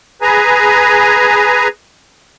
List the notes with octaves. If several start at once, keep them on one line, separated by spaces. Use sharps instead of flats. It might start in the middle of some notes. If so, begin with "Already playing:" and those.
G#4 B4 G#5 A#5